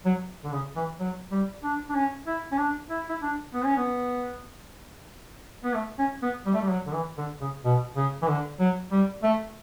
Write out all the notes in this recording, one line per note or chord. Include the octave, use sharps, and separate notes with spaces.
F#3
D3
C#3
E3
F#3
G3
D4
D4
C#4
E4
C#4
D4
E4
E4
D4
B3
C#4
B3
B3
A3
C#4
B3
G3
A3
G3
F#3
D3
E3
D3
C#3
B2
C#3
E3
D3
F#3
G3
A3